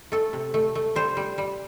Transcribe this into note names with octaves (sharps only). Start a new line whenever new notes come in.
A3 A4
C3
A3
A3
G3 C5
G3
G3